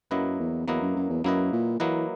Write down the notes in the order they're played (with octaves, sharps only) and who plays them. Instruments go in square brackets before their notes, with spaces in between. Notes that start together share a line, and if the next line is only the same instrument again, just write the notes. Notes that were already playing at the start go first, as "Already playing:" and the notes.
[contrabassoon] F#2 [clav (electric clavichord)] F#3 A#3 E4 B4 D#5
[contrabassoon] E2
[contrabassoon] E2 [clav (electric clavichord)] F#3 A#3 E4 B4 D#5
[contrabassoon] F#2
F#2
E2
[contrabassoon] F#2 [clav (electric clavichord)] F#3 A#3 E4 B4 D#5
[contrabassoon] A#2
[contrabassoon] E3 [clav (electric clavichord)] F#3 A#3 E4 B4 D#5